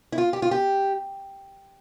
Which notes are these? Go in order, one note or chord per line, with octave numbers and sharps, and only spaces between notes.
E4
F4
G4
F4
G4